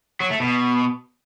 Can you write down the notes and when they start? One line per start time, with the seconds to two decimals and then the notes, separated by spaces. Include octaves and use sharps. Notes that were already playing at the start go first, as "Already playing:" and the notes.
0.20 F#3
0.30 A3
0.40 B2